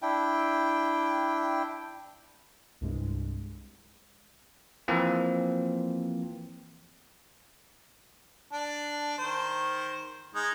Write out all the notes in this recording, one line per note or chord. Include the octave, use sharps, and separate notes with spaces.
D4 E4 G5
C2 G2 G#3
E3 F3 A#3 C4
D4
D#3 C5
G#3 D#4